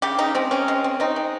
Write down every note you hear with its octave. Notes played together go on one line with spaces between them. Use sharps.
C#3 G4
C#3 D#4
G#3 C4
C4 C#4
G#3
C4
C4 D#4
G#3